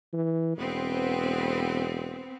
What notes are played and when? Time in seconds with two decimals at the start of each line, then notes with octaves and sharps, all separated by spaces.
0.13 E3
0.57 E1 B3 C4